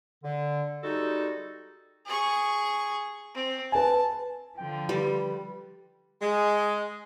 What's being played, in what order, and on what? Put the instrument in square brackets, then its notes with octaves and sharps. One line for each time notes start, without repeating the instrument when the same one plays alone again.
[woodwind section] D3
G3 G#3 D#4 F#4 A4
[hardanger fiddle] G#4 C#6
C4
[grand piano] B4 G#5 [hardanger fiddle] A5
[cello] D3 F3 [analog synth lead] G5
[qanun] G3 [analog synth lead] B4
[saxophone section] G#3